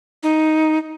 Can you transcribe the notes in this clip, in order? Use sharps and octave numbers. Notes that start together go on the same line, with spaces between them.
D#4